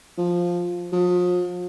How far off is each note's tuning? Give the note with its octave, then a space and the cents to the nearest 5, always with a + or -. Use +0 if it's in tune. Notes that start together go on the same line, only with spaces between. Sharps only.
F3 +5
F3 +40